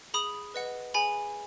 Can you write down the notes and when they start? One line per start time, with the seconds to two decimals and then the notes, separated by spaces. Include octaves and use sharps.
0.14 G#4 B5 D#6
0.54 B4 D#5 F#5
0.94 G#4 G#5 B5